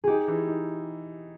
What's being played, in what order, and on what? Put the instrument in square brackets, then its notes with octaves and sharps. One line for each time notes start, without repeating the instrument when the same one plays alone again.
[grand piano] D#4 [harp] G4 G#4
[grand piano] E3
D#4